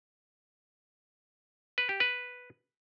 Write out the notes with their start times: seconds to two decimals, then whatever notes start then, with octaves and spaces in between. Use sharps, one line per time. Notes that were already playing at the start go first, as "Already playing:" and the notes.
1.78 B4
1.89 G4
2.00 B4